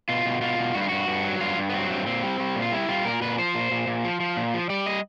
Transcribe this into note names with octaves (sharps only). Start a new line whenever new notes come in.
B2 F4
B2
B2 F4
B2
G2 F#4
F4
G2 F#4
G2
F#3
G2 F4
G2
B3
F#3 C4
G2 C4
A#2 C4
G3
G3
A#2
F4
G3 E4
G3 F4
A#2 A#4
A#2 B4
F3 C5
A#2
A#2
A#2
F3
F3
A#2
F3
G3 D5
D#5